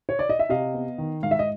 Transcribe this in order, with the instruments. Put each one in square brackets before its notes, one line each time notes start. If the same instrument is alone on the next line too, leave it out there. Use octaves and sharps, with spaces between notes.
[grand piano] C#5
D5
D#5
E5
C3 D#5 F5
B3
D#3
G#2 F5
E5
D#5